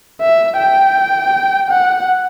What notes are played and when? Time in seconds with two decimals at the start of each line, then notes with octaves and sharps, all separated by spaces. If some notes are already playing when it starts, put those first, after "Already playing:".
0.21 E5
0.59 G5
1.70 F#5